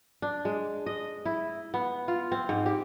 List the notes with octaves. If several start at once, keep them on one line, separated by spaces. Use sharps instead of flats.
D4
G#3
D#5
E4
B3
F4
C4
G#2
G4